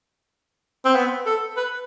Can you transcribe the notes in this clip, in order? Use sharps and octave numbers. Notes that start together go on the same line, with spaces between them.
C4
B3
A4
B4